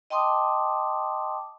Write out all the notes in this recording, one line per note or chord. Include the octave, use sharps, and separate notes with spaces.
D#5 G5 A5 C6 D6 D#6